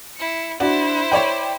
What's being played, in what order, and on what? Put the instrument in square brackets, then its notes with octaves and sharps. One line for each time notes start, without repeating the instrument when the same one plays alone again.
[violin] E4 C#7
[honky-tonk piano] D4 F#4 [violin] E4 C5
[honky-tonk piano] C#5 D5 G5